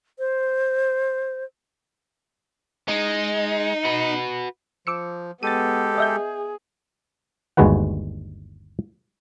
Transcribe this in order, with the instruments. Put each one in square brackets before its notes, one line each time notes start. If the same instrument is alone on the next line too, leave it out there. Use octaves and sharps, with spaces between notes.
[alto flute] C5
[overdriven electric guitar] G#3 [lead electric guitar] D#4
[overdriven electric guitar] F#4 B4
[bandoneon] F3 [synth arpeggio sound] D6 E6 C#7
[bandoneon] G#3 G4 A4 [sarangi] B3 [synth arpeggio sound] A6 D#7
[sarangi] G#4 [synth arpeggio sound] D#5 E5 G6
[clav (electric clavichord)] G1 D#2 G#3 F#4 B4 F#5